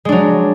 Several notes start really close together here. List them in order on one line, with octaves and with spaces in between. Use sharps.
G#3 D4 F#3